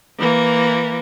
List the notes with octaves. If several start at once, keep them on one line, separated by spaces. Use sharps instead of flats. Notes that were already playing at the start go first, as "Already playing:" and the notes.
E3 A#3